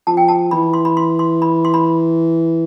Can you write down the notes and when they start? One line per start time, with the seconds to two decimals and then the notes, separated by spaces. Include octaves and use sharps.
0.07 F3 A5
0.17 G5
0.28 A5
0.51 E3 B5
0.74 C6
0.85 B5
0.97 C6
1.19 C6
1.42 B5
1.65 C6
1.74 B5